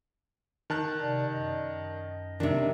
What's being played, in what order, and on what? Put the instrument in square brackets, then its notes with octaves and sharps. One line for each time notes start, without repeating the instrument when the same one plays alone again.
[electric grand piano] D#3 A5 F#6
[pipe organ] C3 D5
F#2 D#5
[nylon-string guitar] C3 D#3 [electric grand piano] D4